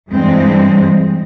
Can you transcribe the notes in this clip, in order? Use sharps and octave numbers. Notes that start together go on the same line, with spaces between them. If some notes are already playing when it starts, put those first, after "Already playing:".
G2 E3 G#3 C4